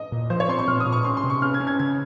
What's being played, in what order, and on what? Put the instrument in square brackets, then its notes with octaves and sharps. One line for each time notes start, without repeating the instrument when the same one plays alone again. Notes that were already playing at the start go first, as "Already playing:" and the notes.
Already playing: [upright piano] D#5
[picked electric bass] A#2
[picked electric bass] F3 [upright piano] C5
[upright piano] C#5
[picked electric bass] C4 [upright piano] C6
[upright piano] C#6
[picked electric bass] A#2 [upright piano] F6
[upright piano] D#6
[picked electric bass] A#2
[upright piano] C#6
[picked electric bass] C#4 [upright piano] C6
[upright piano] C6
[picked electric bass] C3
[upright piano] C#6
[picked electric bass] C#4 [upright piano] F6
[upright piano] G#6
[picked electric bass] C#4
[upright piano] G#6
[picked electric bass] C#3 [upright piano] G#6